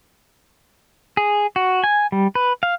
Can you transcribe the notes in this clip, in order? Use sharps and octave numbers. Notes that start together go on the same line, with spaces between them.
G#4
F#4
G#5
G3
B4
F5